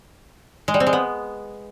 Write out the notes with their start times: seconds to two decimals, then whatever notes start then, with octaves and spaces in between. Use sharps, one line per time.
0.68 G#3
0.74 G3
0.80 C4
0.87 G#3
0.93 B3